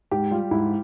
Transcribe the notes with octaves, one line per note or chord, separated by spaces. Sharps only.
G#2 G4
G3 F4
G#2 E4